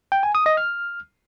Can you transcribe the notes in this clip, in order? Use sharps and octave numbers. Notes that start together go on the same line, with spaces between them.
G5
G#5
D#6
D#5
F6